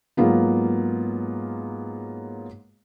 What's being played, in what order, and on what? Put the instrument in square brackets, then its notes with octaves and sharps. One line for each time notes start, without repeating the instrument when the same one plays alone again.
[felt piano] G#2 F#3 A#3 B3 F4